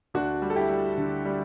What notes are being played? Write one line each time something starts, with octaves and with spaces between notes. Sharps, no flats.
D2 D4 F#4
G3
A4
E4 G4
G3
D3
G3